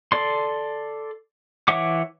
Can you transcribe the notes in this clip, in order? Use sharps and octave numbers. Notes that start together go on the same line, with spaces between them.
A4 D5 C6
E3 C#5 E5 F#5 D6